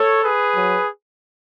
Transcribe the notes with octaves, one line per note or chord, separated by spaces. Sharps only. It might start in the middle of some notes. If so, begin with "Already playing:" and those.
Already playing: A4 C#5
G#4 B4
F#3